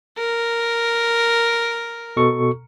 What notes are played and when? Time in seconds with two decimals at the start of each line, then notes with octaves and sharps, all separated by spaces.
0.17 A#4
2.17 B2 A4 C#6